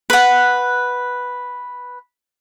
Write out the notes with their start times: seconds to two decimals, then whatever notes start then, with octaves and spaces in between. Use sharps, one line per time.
0.10 B4 F#5